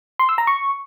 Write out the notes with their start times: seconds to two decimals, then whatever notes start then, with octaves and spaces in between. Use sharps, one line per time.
0.19 C6
0.29 E6
0.38 A#5
0.47 C#6